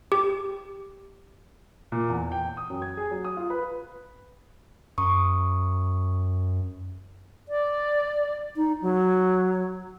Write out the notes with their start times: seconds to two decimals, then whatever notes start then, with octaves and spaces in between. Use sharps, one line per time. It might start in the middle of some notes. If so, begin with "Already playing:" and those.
0.12 G4
1.92 A#2
2.10 E2
2.32 G5
2.57 D#6
2.70 F#2
2.82 G#6
2.97 G#4
3.11 F#3
3.24 D#6
3.37 F4
3.50 B4
4.98 F#2 A#5 C#6 D#6
7.49 D5
8.56 D#4
8.82 F#3